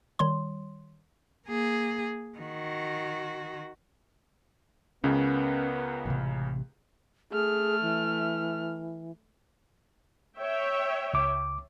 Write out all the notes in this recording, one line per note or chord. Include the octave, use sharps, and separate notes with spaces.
D#3 G3 C#5 C6
A#3 G#4
D#3 F#4
C#2 C#3 B3 C#4 A#4
A1 C3
A3 G#4 F6
E3
C#5 E5 G5
C#2 D6